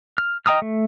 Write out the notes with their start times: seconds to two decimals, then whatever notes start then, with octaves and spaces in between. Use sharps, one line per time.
0.18 F6
0.46 D#5 G5 A#5 D#6 F6
0.62 A3